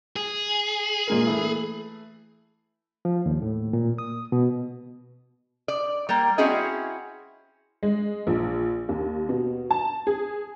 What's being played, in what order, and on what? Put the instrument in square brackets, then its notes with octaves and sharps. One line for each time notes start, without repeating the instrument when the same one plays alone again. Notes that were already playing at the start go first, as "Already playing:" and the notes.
[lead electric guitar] G#4
[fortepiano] A#2 G#3 A#4
E3 A3
[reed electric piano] F3
D#2
A2
A#2
D#6
B2
[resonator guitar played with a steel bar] D5
G3 A#3
C4 C#4 E4 F#4 G#4 D#5
[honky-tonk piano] G#3
A#1
D#2
B2
A5
G#4